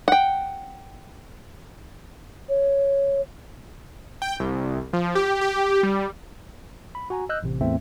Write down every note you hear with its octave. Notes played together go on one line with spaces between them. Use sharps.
F#5 G5
C#5
G5
C2
F3
G4
G4
G3
B5
F#4 G#5 A#5
D#5 E6 F#6 G6
A1 C3
E2 A2 A3 C4 E5